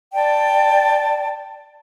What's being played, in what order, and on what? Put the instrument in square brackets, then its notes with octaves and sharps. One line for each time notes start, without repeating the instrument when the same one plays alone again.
[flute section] D5 G5 A5